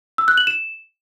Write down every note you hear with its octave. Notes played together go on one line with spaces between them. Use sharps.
E6
F#6
F#7
E7